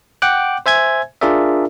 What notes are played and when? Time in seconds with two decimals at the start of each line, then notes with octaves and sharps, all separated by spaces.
0.22 F#5 G5 D6 F#6
0.66 C5 E5 G#5 G#6
1.21 D4 F4 G#4 A#4 D5 E5